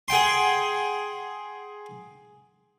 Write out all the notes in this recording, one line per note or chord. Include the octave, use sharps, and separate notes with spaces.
G#4 F#5 G5 C6